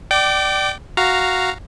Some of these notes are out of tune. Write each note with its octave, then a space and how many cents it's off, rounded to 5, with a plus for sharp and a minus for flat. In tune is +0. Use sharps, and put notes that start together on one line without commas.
D5 +15 G5 -30 D6 +0
F#4 +0 F5 -5 A#5 +0